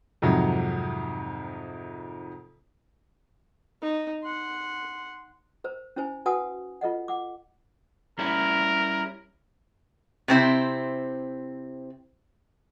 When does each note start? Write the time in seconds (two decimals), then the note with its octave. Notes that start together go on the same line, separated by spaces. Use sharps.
0.22 F2 G#2 C3 D#3 F#3
3.82 D#4
4.23 F#5 C6
5.64 A#4 C5
5.96 C#4 E4 C5 G#5
6.26 F#4 B4 F#5 G#5 A5 D#6
6.81 F4 A4 D#5 F#5
7.08 F#5 D6
8.19 G3 C#4 E4 A#4
10.28 C3 C4 E4 C5